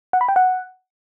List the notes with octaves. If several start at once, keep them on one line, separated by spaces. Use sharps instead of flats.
F#5
B5
G5
F#5